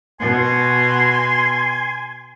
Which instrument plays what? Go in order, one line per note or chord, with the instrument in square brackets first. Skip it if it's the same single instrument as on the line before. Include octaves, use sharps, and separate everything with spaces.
[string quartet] B2 [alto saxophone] G#5 [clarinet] C6